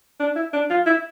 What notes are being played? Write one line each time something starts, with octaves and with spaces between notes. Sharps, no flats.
D4
E4
D4
F4
E4